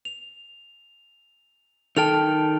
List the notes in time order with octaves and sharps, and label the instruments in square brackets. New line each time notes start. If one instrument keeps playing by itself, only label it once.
[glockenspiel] F7
[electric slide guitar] D#3 A4 G5 [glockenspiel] A5 F6 F7